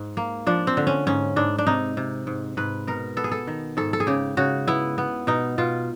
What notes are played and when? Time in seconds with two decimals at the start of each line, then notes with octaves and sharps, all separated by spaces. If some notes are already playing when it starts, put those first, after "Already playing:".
Already playing: G#2
0.17 A#3
0.47 F3 D4
0.67 C4
0.77 D3
0.87 C#4
1.07 G#2 C#4
1.36 G#2 D4
1.58 D4
1.67 C3 D#4
1.97 C3
2.27 G#2
2.57 G#2 B4
2.87 B2 A#4
3.17 B3 A4
3.24 G#4
3.32 A4
3.47 D#3
3.77 G#2 A4
3.93 A4
4.00 G#4
4.07 C#3 G4
4.37 C#3 F#4
4.68 B3 E4
4.98 B3
5.27 B2 D#4
5.58 B2 F4